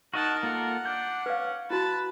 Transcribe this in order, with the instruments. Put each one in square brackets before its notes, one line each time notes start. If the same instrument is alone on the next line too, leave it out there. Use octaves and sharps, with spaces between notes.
[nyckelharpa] D#4 A5 [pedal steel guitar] F#4 D#5 F#5 [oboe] A#4
[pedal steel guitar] A#3 F4 A4 [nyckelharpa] F#5
[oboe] D4 [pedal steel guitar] G6
[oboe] C#4 [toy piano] B4 F5
[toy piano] E4 F#4 [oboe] B4 [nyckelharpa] A5